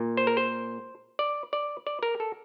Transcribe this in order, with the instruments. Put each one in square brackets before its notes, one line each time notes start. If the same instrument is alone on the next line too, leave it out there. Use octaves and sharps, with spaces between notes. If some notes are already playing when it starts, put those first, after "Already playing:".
Already playing: [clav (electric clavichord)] A#2
C5
A#4
C5
D5
D5
D5
A#4
A4